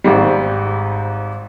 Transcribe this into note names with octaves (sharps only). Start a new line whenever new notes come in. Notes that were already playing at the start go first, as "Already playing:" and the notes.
G#1 G#2 G3